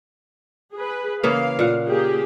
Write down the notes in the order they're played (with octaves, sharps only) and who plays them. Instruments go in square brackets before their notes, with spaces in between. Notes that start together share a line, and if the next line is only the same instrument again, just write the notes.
[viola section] G#4 B4
[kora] C#3 E3 A#3 [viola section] F5
[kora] A#2 F#5
[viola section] A#3 G4 G#4